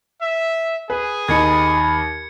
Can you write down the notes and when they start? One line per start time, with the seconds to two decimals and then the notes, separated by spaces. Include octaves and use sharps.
0.21 E5
0.90 G#4 B4
1.28 D#2 D#4 B5 G#6 C#7